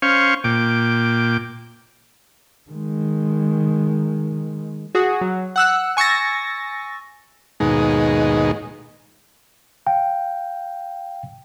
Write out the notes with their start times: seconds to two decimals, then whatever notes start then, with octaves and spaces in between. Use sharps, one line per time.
0.02 C#4 C5 F5 C#6
0.44 A#2 G5 D6
2.70 D#3 G#3
4.95 F#4 G#4
5.21 F#3
5.56 F#5 E6 F#6
5.97 G#5 C#6 E6 A6 A#6
7.60 D#2 G#2 B2 G#3 D#4
9.86 F5 G5